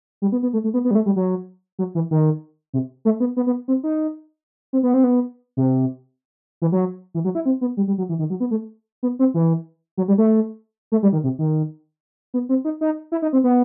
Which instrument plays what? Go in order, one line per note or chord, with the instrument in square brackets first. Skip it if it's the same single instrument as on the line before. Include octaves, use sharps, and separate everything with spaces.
[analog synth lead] G3
B3
B3
A3
A3
B3
B3
G3
A3
G3
F#3
F#3
E3
D#3
C3
A3
B3
B3
B3
C4
D#4
C4
B3
C4
B3
C3
E3
F#3
E3
F#3
E4
C4
B3
G3
G3
F#3
E3
D#3
F#3
B3
A3
B3
C4
E3
F#3
G3
A3
A3
G3
D#3
C3
D#3
B3
C4
D#4
D#4
E4
D#4
C4
B3